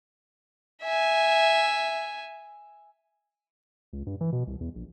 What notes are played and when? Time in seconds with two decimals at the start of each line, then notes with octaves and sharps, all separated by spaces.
0.84 E5 G#5
3.93 C#2
4.07 G2
4.21 E3
4.32 B2
4.47 C2
4.61 E2
4.75 A#1